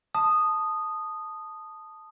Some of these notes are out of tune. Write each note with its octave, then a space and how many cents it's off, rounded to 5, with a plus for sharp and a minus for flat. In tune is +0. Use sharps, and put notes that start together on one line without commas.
A5 +0 D#6 -10